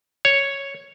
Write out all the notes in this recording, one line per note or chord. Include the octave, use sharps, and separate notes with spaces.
C#5